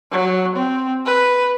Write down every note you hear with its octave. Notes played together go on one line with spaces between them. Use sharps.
F#3
C4
B4